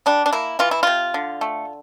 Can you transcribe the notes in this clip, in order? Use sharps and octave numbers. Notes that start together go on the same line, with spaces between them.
G3 D4
D4
A#3 E4
E3 F4
E4
C3 F4
D3
A3